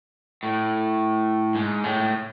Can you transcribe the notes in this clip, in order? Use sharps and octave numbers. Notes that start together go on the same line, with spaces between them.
A2
G#2
A2